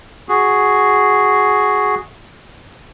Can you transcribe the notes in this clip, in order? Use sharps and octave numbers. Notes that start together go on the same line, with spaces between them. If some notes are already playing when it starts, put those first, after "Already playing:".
F#4 G#4